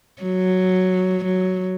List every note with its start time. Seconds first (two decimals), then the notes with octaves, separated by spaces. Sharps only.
0.23 F#3
1.25 F#3